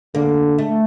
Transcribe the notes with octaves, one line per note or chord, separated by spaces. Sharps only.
D3 A#3
A3